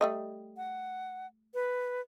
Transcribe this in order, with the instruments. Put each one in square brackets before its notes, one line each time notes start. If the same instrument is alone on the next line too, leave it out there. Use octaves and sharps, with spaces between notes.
[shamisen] G3 A3 D#5
[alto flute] F#5
B4